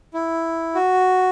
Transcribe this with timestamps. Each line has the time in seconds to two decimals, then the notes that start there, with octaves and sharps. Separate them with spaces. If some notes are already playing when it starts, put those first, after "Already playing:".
0.14 E4
0.75 F#4